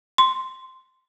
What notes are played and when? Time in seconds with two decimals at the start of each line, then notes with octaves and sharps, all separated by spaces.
0.18 C6